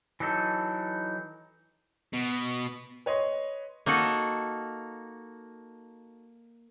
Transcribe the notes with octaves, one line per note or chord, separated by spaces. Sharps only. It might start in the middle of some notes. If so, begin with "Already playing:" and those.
E3 F#3 D#4 A4
B2
B4 C#5 D#5 C6
A#3 D#4 F#4 A4